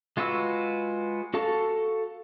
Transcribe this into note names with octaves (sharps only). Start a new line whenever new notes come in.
G#3 F4 F#4 B4 E6
F#4 A4 F5 A5 C#6